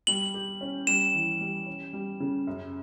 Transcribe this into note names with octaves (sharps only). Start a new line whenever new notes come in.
G3 F#7
G4
C#4
G3 E7
E3
G3
C#4
G3
C#3
F#2